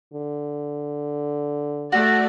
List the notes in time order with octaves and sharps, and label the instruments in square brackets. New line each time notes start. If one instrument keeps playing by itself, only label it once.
[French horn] D3
[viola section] A3 D5 [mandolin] F#4